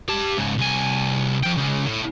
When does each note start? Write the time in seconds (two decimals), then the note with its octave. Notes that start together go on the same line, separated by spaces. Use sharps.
0.08 G4 A5
0.37 G#2 C#3
0.58 C2 G#5
1.44 F3 G5
1.58 C#3 G#3
1.86 A2